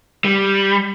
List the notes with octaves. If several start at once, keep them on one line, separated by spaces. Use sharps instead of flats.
G3